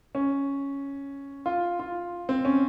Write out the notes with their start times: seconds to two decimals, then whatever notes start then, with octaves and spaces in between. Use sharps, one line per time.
0.15 C#4
1.46 F4
1.80 F4
2.29 C4
2.45 C#4